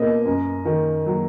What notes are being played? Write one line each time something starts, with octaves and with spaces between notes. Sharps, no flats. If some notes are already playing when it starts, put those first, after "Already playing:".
Already playing: B2 A#3 D#5
F#2
D#3
F#3